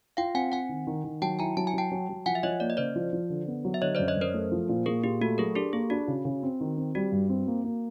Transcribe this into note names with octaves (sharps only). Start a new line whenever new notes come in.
F4 F5 G5
C4 F#5 G#5
C4 F#5 G#5
D#3
D#3
D#3
F#3 G5 A5
E4 G#5 A#5
F#3 A5
G#5
F#3 G5 A5
F#3
F#3
F3 F#5 G#5
E5
F3 C#5 D#5
A#3 D5
D#5
C#3 C5 D5
F3
F3
D3
B3
F#3
E5
D3 C#5 D#5
F#2 C5 D5
C#5 D#5
F#2 A#4 C5
A3
F3
A#2
A#2 G#4 A#4
A#2 G4
A3 F#4
F#3 G#4 A#4
D4 G4 A4
A#3 G#4
D4 F#4
C#3
C#3
C4
D#3
C4
G3 F#4
G2
C4
A#3
A#3